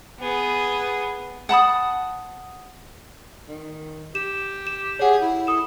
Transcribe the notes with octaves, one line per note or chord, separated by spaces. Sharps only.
B3 G#4
F#5 A5 B5 D#6
D#3
G4 E7
E7
G#4 C#5 F#5
E4
A4 D#6 E7